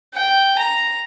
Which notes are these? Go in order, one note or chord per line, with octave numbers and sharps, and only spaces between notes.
G5
A#5